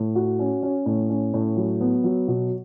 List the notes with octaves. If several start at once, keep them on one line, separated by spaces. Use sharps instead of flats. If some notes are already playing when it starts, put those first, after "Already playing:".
Already playing: A2
F#4
C#4
C#4
A2
C#4
A2
F#3
B3
F#3
B2